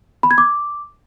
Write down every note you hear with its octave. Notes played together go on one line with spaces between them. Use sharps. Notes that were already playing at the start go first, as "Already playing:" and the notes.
B5
G#6
D6